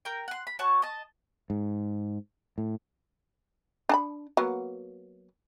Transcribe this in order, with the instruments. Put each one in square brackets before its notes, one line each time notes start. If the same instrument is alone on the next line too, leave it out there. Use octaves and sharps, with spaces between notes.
[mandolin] A#4 G5
F#5 C6
B5
F#4 C#5 A5 C#6
D#5 A5
[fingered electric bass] G#2
A2
[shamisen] D4 A5 B5
F#3 A#3 B3